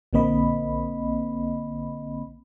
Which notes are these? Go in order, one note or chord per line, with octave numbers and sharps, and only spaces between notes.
A#1 D3 A#3 C4 D#5 B5